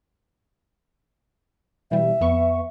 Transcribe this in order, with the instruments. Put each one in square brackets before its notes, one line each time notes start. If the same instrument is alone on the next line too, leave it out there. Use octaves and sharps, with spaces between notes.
[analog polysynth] B2 E3 G3 [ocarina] E5
[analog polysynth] F2 B3 C#6